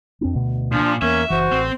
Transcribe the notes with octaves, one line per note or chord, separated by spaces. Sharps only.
F2 C4 D4
D2 B2
A#2 F3 D4
E2 A#3 C#4 E5
F#1 E3 F#4 C5
A1 C4